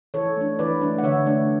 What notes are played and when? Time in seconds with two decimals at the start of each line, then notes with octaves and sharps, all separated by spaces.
0.14 E3 A4 C#5
0.36 A3 D4
0.59 E3 B4 D5
0.81 A3 D4
0.98 F#5
1.03 D3 C#5 E5
1.26 A3 D4